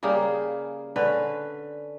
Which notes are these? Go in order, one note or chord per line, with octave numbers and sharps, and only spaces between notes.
C#3 G3 A#3 G#4
D3 C#4 B4